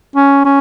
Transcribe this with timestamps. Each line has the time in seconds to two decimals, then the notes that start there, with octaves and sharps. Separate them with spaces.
0.16 C#4
0.45 C#4